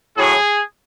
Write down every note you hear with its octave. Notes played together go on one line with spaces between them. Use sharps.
A2 F#3 G#4